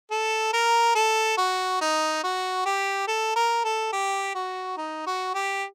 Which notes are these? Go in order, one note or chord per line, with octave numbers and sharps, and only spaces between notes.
A4
A#4
A4
F#4
D#4
F#4
G4
A4
A#4
A4
G4
F#4
D#4
F#4
G4